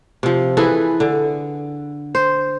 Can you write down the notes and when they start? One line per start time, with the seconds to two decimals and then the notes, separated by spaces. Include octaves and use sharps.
0.23 C3 F3
0.57 E3 G#4 A4 B4
1.00 D3
2.15 C5